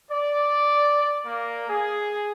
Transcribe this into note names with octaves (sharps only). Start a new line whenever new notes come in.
D5
A#3
G#4